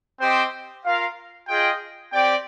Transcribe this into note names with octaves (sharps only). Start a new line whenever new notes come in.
C4 G4 C5 D#5 G5
F4 A#4 F5
F4 G#4 D#5 G5
C4 G4 D5 G5